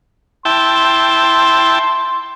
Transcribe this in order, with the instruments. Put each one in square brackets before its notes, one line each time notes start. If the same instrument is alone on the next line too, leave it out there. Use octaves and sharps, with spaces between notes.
[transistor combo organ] E4 G5 A5 [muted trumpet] C6